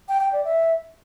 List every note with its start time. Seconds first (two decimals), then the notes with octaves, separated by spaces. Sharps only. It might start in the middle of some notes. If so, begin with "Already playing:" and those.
0.09 G5
0.21 G5
0.33 D5
0.45 E5